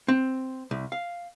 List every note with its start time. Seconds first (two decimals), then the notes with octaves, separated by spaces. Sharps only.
0.08 C4
0.71 C2
0.92 F5